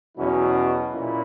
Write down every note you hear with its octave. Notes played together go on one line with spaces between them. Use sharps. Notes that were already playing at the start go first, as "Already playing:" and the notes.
E2 B2 F#3 C#4 E4
A#2 C#4 E4